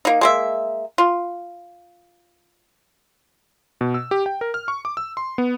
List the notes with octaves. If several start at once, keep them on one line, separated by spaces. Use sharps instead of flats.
A#3 D#4
G#3 A#3 E5
F4
B2
E6
G4
G5
A#4
F6
C#6
D6
E6
C6
B3